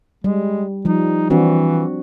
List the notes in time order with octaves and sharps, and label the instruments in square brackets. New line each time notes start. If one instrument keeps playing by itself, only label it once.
[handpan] G3 [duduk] G#3
[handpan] F3 G3 [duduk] D#4
[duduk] E3 [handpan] C4 D4 F#4